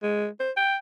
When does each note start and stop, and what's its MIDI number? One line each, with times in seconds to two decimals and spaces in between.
0.03 0.28 56
0.40 0.51 72
0.57 0.76 79